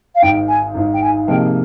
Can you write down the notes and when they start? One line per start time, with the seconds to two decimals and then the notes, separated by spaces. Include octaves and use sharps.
0.15 F5
0.22 G#1 G#2 D#3 G5
0.48 G#5
0.74 G#1 G#2 D#3
0.94 G5
1.02 G#5
1.28 C3 F3 A#3 D#4 G#4 G5